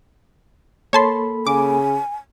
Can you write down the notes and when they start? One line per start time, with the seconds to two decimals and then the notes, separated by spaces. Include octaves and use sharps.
0.93 A#3 A4 C#5 A5 B5 C6
1.47 C#3 G#5 D6